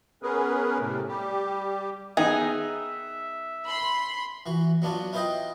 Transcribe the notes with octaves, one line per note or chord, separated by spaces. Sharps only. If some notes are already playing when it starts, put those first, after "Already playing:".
B3 C#4 G#4 A#4 B4
A2 C3 A3
G3 G4
D#3 B3 D#4 G#4 E5
B5 C6
E3 F#4
F#3 B3 D4 F4 F#4
E4 F4 B4 C5 D#5 G5